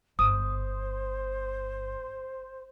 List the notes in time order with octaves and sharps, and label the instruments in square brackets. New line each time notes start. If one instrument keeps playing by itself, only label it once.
[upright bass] G1 [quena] C5 [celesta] D#6